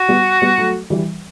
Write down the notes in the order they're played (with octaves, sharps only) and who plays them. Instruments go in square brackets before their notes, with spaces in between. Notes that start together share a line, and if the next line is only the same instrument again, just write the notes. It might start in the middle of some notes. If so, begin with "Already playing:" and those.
Already playing: [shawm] F#4
[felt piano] G3 B3
G3 B3
F#3 A3
E3 G3